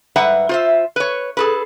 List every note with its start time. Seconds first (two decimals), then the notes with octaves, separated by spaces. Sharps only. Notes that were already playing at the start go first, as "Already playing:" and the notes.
0.16 G#2 G3 B4 E5 F#5
0.49 F4 C5 E5
0.96 B4 C#5
1.37 G#4 A4 B4